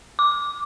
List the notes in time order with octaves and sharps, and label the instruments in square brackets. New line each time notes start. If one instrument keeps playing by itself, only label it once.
[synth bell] D6